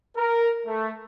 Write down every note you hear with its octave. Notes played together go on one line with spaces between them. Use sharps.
A#4
A3